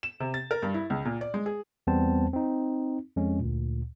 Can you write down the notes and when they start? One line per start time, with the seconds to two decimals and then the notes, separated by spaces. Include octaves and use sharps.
0.03 E7
0.20 C3
0.34 A6
0.51 A#4
0.62 G2
0.74 E4
0.90 C#2
1.05 A#2
1.21 D5
1.34 G#3
1.46 G#4
1.87 E2 G3 B3 C4 C5 A5
2.33 C4 D#4
3.16 F2 G#3 C#4
3.40 D2 A#2